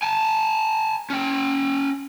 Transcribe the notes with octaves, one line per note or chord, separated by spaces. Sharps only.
G#5 A5
C#4 G5